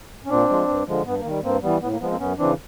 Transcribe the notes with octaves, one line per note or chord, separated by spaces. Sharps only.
C#4
A#2 C4 D4
F3 G#3
G2
D3 F3 G#3
G2 B3
A#3
D#3 G3
G2 A#3 C4
E3 G3 B3
A2 B3
A#3
F3 G#3 B3
A#3 C4
F#2 B3 C#4
C#3 E3 C4 D4